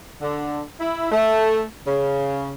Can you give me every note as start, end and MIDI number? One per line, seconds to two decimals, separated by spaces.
0.22 0.64 50
0.80 1.10 64
1.12 1.62 57
1.87 2.54 49